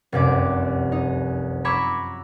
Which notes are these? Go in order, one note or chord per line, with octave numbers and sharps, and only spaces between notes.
F1 C2 F#2 D6
D#4
A#5 B5 C#6 D6 E6 G#6